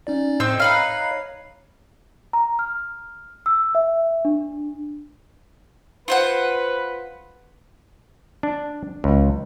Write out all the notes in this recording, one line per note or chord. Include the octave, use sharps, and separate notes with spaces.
C#4 D#4 D5
A2 C4 D#4 E6
D#4 B4 C#5 F5 C7
A#5
F6
E6
E5
D4
F4 B4 C5 F#5
D4
C#2